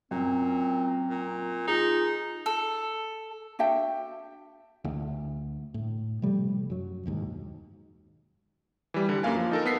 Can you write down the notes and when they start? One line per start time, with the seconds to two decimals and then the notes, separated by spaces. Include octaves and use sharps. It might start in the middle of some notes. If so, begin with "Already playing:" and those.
0.11 F#2 A#2 C4
1.10 A#2
1.68 D#4 F4 G#4
2.46 A4
3.59 D4 F#4 E5 G5
4.84 D2
5.74 A2
6.22 C3 F3 G3 A3
6.70 F#2 F#3
7.06 E1 D#2 G#2
8.94 E3 G3
9.09 D3 G3
9.23 F#2 A#3 F5 G#5
9.36 F3
9.51 D#4 A4 A#4
9.65 B3 A4 B6 C7